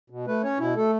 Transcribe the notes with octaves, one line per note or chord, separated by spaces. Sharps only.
B2
A3 B4
C#4 C#5
B2 E4
A3 A4